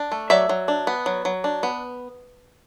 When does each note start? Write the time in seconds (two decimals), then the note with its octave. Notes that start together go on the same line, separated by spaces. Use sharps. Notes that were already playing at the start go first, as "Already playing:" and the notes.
Already playing: D4
0.12 A3
0.30 F#3 D5 E5
0.49 F#3
0.68 D4
0.87 B3
1.06 F#3
1.25 F#3
1.44 D4
1.63 B3